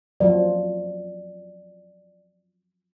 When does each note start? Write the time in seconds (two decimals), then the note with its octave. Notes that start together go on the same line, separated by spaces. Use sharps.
0.20 F3 F#3 D5